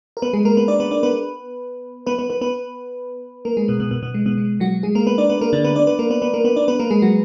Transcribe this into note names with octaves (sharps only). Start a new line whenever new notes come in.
A#4
B3 B4
G#3 G#4
A#3 A#4
B3 B4
D4 D5
B3 B4
D4 D5
B3 B4
B3 B4
B3 B4
B3 B4
B3 B4
A#3 A#4
G#3 G#4
B2 B3
B2 B3
B2 B3
B2 B3
G#3
B2 B3
G#3
F#3 F#4
G#3 G#4
A#3 A#4
B3 B4
D4 D5
B3 B4
A#3 A#4
D3 D4
B3 B4
D4 D5
B3 B4
A#3 A#4
B3 B4
B3 B4
A#3 A#4
B3 B4
D4 D5
B3 B4
A#3 A#4
G#3 G#4
F#3 F#4